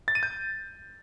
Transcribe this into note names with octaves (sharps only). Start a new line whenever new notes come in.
A6
D#7
G6